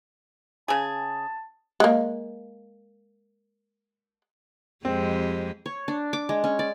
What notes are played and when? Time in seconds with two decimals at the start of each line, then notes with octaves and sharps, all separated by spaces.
0.68 C#3 G#4 A5
1.80 G#3 A#3
4.85 F2 G#3 C4 G4
5.66 C#5
5.88 D4
6.13 D6
6.29 G#3
6.44 C#4
6.59 D5